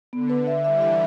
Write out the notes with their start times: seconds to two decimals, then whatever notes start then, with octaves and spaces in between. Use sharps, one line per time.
0.13 D3 B3
0.30 B4
0.47 E5
0.64 E3 G3 E5
0.81 E5